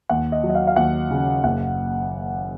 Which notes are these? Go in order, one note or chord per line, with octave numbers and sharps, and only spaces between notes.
D#2 F#5
D#5
F#3
D#5
F5
F5
D#2 F#5
C#3
F#1 F#5